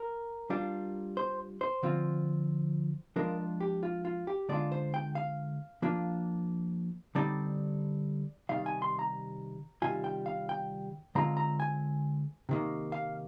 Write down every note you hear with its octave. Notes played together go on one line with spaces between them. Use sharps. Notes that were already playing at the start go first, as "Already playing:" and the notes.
Already playing: A#4
G3 D4 F4
C5
C5
D3 F3 C4 F4
F3 G#3 D4 F4 A#4
G4
F4
F4
G4
D3 G#3 D4 F4 D5
C5
G5
F5
F3 A#3 D4 F4
D3 G3 C4 D#4 D5
C3 D#3 G3 F5
G#5
C6
A#5
C3 D#3 G3 F4 G#5
G5
F5
G5
D3 G#3 C4 F4 A#5
A#5
G#5
C3 D#3 A#3
F5